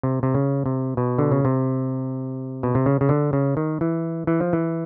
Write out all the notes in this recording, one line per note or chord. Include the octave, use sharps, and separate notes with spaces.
C3
C3
C#3
C3
B2
D3
C#3
C3
B2
C3
C#3
C#3
D3
C#3
D#3
E3
E3
F3
E3